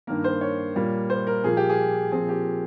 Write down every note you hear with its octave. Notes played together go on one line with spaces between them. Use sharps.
G2 D#3 A#3 A#4
C5
C#5
A#2 G3 A#3
C5
A#4
A#2 F3 A#3 G#4
G4
G#4
A#2 F3 C4 G#4
G4